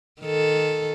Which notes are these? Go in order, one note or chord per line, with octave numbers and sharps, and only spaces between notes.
D#3 A4